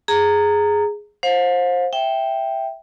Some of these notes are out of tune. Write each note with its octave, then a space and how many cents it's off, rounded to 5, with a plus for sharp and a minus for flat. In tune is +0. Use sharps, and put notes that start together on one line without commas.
G#4 +0 A#5 -15
C5 +20 F5 +40
E5 +0 G5 +0